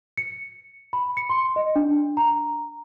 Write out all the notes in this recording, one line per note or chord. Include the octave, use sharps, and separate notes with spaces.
C#7
B5
C#7
C6
D#5
D4
A#5